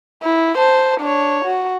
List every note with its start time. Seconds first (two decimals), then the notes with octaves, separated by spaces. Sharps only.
0.23 E4
0.56 C5 A5
1.00 D4 C#5
1.45 F#4